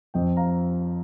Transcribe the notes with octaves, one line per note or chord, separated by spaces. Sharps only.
F2 F3 C4 D#5 G5
F5 A#5